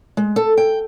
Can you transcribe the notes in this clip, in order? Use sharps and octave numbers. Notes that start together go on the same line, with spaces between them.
G#3
A4
G5